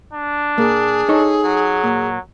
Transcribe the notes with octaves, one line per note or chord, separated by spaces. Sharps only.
D4
A#2 A#3 G#4
D#4 A4 C#5
F#3
A#2